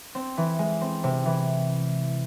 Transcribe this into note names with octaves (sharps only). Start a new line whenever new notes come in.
C4
E3
G#3
C4
C3
E3